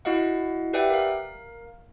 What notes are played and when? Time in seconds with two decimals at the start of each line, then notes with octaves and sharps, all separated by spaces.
0.05 E4 F#4 D#5 F5 F#5
0.73 G4 B4 D5 E5 F#5 G5
0.90 A#4 F5